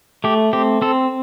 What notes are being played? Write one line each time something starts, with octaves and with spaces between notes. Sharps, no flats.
A3 G4
C4 G4
C4 A4